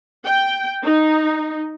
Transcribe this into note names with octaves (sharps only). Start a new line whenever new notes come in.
G5
D#4